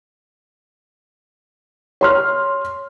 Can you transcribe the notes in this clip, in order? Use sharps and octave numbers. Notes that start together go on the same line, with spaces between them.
C#5 C6 F6